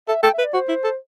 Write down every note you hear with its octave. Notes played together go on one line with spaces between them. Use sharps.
A4 E5
A4 G5
E5
B4
D5
F#4 C5
E4
A4